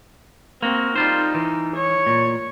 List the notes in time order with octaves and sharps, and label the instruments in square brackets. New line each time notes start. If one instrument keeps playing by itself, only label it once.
[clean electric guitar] A#3 F#4 [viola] C4
[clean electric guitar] G3 F4 C5 [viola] D#4
[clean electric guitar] E3
[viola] C#5
[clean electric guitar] A#2